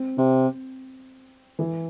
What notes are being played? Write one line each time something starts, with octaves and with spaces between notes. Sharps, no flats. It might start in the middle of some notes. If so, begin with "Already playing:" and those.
Already playing: C4
C3
E3